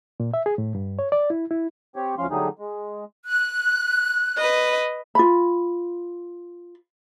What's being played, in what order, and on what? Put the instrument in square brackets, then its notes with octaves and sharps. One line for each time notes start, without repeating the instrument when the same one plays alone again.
[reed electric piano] A#2
E5
G#4
A2
G2
C#5
D5
E4
E4
[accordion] C4 G4 C#5
D2 F3 C#4 F5 C6
D3 F#3 G3 A3 D#4 G#4
G#3
[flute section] F#6
[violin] B4 D#5
[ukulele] F4 B5